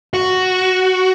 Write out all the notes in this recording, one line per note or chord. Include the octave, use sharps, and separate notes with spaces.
F#4